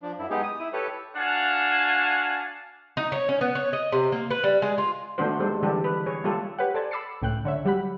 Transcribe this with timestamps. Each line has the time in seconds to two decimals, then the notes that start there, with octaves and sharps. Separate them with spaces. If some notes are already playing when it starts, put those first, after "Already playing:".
0.02 F3 D4
0.19 F#2 E4
0.30 G#3 B3 D#4 G4 G#4
0.43 D#6
0.59 E4
0.73 G4 A4 B4 C#5
1.16 D4 F#4 F5 F#5 G#5 A5
2.97 D#4
3.12 C#5
3.29 C#4
3.41 B3
3.55 C#5
3.73 D#5
3.92 C3
4.12 A#3
4.31 B4
4.43 G3
4.62 G#3
4.78 F4
5.18 D#3 A3 B3 D4 F#4 C5
5.39 G3 G#3 A#3 A4 C5
5.62 D3 E3 G3 D4 G4 A4
5.84 B4
6.06 G#4 C#5
6.24 G3 A#3 F4 G4 A4
6.58 G4 B4 C#5 F#5
6.74 A4 C5 D5 G#5 A5 C6
6.91 B5 D6 E6 A6 C7 C#7
7.22 C#2 A2 G5 F#6
7.45 D3 C#5 E5
7.65 F#3 G3 G4 F#5 B5